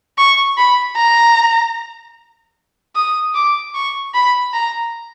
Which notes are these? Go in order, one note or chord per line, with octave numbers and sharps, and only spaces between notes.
C#6
B5
A#5
D#6
D6
C#6
B5
A#5